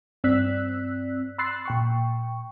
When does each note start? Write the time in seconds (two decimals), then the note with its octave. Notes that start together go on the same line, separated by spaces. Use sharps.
0.24 G2 C4 D5 E6 F#6 B6
1.38 B5 C6 E6 F#6 A6 C7
1.66 A#2 G5 C#6